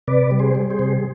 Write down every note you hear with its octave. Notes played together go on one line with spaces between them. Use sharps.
C3 B4 D5
G3
G#4 C5
G3
G#4 C5
C3